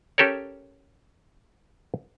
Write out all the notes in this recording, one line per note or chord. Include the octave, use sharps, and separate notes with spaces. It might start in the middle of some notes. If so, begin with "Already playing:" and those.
C#4 G4 A4 A#4 C#5